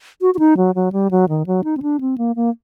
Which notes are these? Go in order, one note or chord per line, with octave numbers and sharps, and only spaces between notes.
F#4
F#4
D#4
F#3
F#3
G3
F#3
D#3
F#3
D#4
C4
D4
C4
A#3
A#3